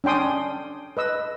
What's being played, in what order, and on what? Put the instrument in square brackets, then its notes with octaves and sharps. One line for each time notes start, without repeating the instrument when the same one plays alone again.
[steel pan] C#4 D4 G5 C6 D#6
B4 D#5 E6